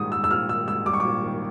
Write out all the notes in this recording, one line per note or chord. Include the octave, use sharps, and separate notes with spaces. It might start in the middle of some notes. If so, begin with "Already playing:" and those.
Already playing: A#1 G#2 D#3 G3 D#6
G3 E6
E6
A#1 F6
D#3 E6
G#2 E6
G3 D6
C#6
A#1 D6
D#3